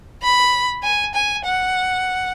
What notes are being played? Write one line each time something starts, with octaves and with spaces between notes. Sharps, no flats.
B5
G#5
G#5
F#5